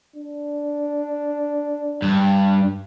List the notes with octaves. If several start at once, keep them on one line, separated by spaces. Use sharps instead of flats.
D4
G2